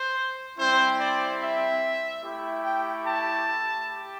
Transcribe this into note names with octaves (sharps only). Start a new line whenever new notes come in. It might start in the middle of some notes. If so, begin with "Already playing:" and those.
Already playing: C5
G3 C4 E4 C5
D5
E5
A3 E4 G4
G5
A5
G4